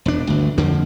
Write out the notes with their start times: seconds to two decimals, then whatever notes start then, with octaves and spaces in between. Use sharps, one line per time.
0.06 E1 D4
0.27 G1 D2
0.58 F2 D3 F3 A#3